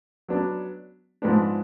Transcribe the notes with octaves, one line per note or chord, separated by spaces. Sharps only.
F#3 B3 D4
G#2 F3 B3 D4